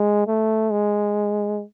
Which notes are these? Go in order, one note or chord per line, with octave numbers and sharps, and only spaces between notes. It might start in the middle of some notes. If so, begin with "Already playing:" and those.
Already playing: G#3
A3
G#3